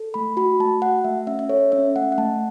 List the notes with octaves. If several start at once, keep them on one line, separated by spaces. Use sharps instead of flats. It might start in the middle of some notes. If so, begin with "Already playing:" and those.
Already playing: A4
A3 B5
F#4 B5
A3 A5
F#4 F#5
A3 E5
C#4 E5
E5
A4 C#5
C#4 E5
A3 F#5
F#5
A3 A5